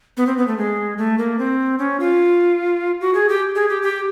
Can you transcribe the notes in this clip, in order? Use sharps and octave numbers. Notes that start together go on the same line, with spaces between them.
B3
C4
B3
A3
G#3
A3
A#3
C4
C#4
F4
F#4
G#4
G4
G#4
G4
G4